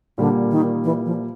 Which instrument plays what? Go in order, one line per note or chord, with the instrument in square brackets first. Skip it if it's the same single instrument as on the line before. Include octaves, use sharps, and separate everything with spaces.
[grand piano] A#2 G3 A#3 [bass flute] D3
[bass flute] D#3
E3
F3